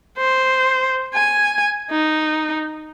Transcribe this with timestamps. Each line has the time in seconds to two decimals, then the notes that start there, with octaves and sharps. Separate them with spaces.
0.17 C5
1.14 G#5
1.90 D#4